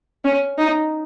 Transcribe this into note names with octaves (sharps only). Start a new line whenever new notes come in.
C#4
D#4